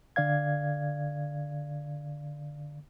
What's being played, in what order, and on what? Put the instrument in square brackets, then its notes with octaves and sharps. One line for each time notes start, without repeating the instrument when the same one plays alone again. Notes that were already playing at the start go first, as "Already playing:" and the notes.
[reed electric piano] D3 D5 F5 G#6